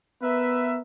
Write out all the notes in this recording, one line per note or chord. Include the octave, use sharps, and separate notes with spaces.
B3 A#4 B4 E5